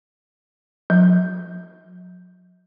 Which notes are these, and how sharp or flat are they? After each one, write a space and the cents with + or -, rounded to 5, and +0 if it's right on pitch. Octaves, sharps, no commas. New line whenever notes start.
F#3 -45